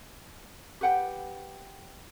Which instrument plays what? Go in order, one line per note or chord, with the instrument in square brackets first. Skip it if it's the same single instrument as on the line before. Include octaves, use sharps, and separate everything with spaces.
[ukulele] G4 B4 F#5 G5